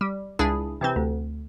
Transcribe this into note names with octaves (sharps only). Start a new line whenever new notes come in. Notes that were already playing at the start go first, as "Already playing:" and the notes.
G3
C#2 D4 E4 G#4
C3 E3 C4
D2